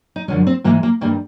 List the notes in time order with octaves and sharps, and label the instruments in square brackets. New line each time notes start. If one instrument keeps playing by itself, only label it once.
[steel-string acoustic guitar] D#4
F#2 D3 F3 G#3 C#4
C4
G#2 E3 G#3 A#3
A#3
G2 D#3 G3 A#3